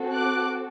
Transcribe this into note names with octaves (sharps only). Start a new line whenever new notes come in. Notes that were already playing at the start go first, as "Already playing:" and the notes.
Already playing: C4 F#4 A4
D6 F#6